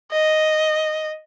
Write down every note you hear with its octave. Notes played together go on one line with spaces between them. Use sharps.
D#5